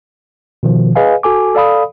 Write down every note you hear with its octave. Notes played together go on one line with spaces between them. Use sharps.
B2 D#3 F3
G#4 B4 D#5 F5 G#5
F#4 A4 G#5 D6
A4 D5 F5 B5 D#6